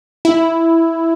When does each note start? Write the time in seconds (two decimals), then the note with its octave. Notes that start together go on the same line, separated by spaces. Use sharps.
0.25 E4